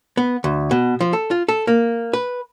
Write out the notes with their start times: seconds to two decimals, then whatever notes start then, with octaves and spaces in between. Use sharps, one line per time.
0.17 B3
0.44 D2
0.71 B2
1.01 F3
1.13 A4
1.31 F4
1.49 A4
1.67 A#3
2.13 B4